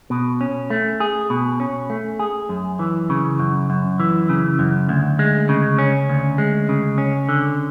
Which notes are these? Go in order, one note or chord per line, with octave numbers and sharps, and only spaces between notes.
B2
C#4
A3
G#4
B2
C#4
A3
G#4
F#2
E3
C#3
F#2
F#2
E3
C#3
F#2
D2
G#3
C#3
C#4
D2
G#3
C#3
C#4
D3